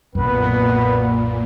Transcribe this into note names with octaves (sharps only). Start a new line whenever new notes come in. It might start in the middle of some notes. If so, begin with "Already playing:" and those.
B1 F#2 A#2 B3 B4